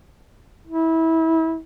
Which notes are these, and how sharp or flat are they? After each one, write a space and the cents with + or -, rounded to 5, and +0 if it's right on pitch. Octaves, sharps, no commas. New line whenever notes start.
E4 -25